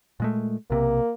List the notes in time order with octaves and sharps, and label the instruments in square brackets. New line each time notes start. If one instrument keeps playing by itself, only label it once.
[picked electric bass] A#2 G#3 A3
[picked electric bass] B1 C3 [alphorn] A#3